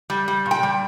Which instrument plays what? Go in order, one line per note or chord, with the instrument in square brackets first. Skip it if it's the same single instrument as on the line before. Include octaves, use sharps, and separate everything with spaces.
[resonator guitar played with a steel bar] G3
G3
A#2
G5
G3